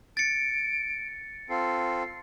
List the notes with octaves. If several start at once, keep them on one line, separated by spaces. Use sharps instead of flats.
A6 C#7 D7
C4 F4 A4 C7